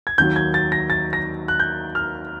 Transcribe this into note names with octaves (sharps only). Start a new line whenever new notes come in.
G#6
D#2 D#3 F#3 G6
G#6
A6
A#6
A6
A#6
F#6
G6
F6